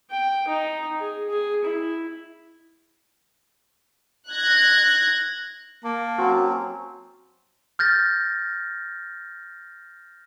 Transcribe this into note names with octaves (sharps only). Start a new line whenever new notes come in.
G5
D#4
G#4
G#4
E4
F#6 G#6 A#6
A#3 A5
F#3 C4 C#4 F#4
F6 G6 A6 A#6